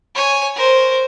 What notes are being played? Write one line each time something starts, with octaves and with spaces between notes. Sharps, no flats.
C#5 G#5
A#4 C5